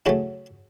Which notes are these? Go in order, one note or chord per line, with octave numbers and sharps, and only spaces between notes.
C#3 F#3 A3 C#4 E4